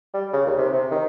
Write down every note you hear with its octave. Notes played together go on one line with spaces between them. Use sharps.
G3
C#3
D#2
C3
C3
D#3